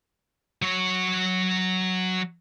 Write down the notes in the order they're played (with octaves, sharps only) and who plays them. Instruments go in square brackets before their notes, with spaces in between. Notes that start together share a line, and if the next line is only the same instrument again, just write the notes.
[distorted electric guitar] F#3 C#5